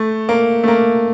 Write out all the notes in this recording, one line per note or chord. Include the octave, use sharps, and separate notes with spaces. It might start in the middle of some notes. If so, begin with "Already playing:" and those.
Already playing: A3
A#3
A3
A#3